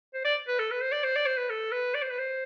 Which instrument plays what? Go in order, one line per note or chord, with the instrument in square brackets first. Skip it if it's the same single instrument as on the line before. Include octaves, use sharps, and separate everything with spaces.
[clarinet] C5
D5
B4
A4
B4
C5
D5
C5
D5
C5
B4
A4
B4
D5
C5
B4
C5